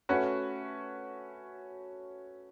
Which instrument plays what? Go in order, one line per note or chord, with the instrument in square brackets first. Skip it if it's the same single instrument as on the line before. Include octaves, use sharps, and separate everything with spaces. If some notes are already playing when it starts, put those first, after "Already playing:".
[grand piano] A3 C#4 F#4 B4